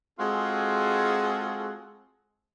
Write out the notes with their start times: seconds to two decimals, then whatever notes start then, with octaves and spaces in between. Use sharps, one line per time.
0.19 G#3 C4 F4 F#4 G#4 A4